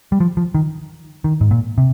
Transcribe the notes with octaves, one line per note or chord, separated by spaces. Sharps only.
G3
F3
F3
D#3
D#3
G#2
A#2
C3